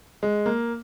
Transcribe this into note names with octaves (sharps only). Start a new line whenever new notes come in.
G#3
A#3